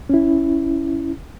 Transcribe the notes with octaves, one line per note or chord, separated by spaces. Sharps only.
C#4 E4